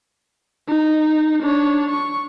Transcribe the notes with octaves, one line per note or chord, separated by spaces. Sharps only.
D#4
D4 C#5
C#6